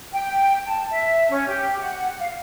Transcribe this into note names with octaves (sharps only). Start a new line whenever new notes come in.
G5
A5
E5
C#4
G4
F#5
F5